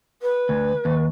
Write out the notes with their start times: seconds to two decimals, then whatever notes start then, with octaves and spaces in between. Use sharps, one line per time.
0.22 B4
0.49 D2
0.85 D#2